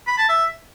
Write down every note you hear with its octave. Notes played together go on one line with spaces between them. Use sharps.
B5
A5
E5